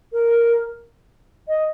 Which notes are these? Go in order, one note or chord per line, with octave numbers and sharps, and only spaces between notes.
A#4
D#5